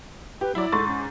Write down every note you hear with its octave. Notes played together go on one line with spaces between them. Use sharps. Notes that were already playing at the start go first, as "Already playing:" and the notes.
G4 B4
F#3 E4 D5
G#2 A4 C6 C#6 A6
C#4